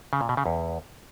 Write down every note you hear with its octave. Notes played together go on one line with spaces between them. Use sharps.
C#3
A#2
B2
C#3
E2